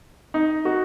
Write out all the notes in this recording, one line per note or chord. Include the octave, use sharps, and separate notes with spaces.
D#4
F#4